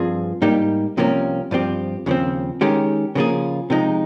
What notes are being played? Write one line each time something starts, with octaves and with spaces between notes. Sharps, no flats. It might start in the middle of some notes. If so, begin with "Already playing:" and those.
Already playing: G2 F3 C4 F4 G#4
G#2 G3 A#3 D#4 G4
C2 C3 F3 A#3 C#4
G2 F3 C4 G4
D#2 C#3 F3 C4
D#3 G#3 C#4 G4
C#3 F3 A#3 F4 G#4
C3 F3 G#3 D#4